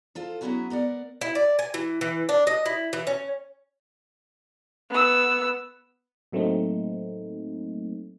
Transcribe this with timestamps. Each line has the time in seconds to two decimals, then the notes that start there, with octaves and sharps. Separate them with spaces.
0.15 F4 A4 C5
0.41 F#3 B3 C#4 E4 F#4 G#4
0.70 B3 A#4 D5 F#5
1.21 E4
1.35 D5
1.59 G#5
1.74 E3
2.01 E3
2.29 D4
2.47 D#5
2.66 E4
2.93 E3
3.07 C#4
4.90 B3 E6
6.32 A2 F#3 A3 A#3 C4 D#4